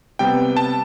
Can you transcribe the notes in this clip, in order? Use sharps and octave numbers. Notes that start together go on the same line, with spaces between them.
C3 G3 B3 G5
A5